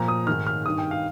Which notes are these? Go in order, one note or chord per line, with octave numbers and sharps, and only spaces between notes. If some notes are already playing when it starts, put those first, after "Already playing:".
Already playing: A#2 F3 A#5
D#6
G#2 D#3 F6
F6
G2 D#3 D#6
G5
F5